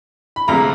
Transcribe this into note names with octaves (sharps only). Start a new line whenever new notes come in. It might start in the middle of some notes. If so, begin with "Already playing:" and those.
B5
D2 C3 F3 G#3 A#5